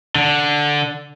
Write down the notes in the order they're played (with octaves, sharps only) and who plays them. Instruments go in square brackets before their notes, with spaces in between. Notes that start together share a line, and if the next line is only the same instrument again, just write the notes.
[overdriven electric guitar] D3